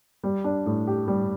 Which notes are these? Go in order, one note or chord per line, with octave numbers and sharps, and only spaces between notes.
G3
D4
A2
G4
G3